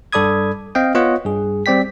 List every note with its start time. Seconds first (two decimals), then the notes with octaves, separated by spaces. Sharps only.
0.13 G2 A4 D5 B5 D#6 G#6
0.75 C4 D#5 F5 G5
0.95 B3 F4 C#5 D#5 F#5
1.25 G2 G#4
1.66 G3 C4 D5 G5 B6